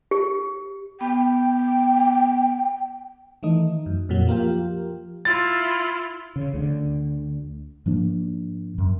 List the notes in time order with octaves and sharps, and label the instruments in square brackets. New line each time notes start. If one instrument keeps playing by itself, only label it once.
[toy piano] G4
[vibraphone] B3 [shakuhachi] G5
[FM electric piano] D#3 E3 A3 D#4
F#2
F2 A#2 F#3
F3 A#3 F4 G4
[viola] E4 F4 [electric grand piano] A6
[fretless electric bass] C#3
D2 D3
G#2 F3 A#3 D4
F#2